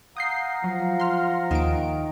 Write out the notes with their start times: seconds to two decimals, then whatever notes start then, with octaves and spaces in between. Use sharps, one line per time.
0.17 F5 F#5 A#5 D#6 G6 C7
0.64 F3 F#3
1.00 C6 F6
1.51 D#2 D#3 D7